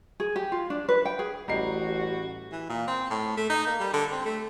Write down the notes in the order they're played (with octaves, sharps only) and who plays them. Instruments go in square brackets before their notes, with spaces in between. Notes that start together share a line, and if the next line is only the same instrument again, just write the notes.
[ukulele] G#4
G4
F4
D4
B4
G5
G#4
[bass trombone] A1 [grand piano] G3 C7 [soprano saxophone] F#4 [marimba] D#5 A#5
[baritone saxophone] E3
A#2
C4
A2
A3
D#4
A#3
G3
D3
C4
A3